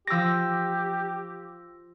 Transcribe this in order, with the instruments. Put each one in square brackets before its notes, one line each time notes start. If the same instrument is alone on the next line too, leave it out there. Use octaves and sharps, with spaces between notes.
[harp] F3 D6 [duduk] G4 [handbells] E6 A#6